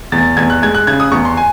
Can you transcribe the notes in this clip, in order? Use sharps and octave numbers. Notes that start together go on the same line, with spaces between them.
E2 A6
E2 G#6
F#6
G#3 G#6
F#6
C#3 G#6
D#6
E2 C#6
C6
G#5